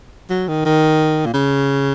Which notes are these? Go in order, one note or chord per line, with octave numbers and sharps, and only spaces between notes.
F#3
D#3
D#3
A#2
C#3